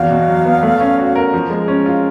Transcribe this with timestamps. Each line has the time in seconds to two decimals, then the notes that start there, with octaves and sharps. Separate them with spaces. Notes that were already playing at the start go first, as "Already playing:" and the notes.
Already playing: E2 F#4 F5
0.10 B2
0.28 F#3
0.45 B3
0.63 A3
0.80 C#4
0.98 F#4
1.15 A#4
1.33 F3
1.50 G#3
1.68 C#4
1.86 F4